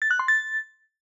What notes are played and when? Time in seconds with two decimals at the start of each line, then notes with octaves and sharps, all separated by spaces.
0.02 A6
0.11 F#6
0.19 C6
0.28 A6